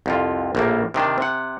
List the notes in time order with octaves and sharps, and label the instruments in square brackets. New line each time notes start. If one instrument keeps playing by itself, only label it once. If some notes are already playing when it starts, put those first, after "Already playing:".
[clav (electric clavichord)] C2 F2 F4
A#1 A2 A#3
C3 D#3 D4
C3 F#5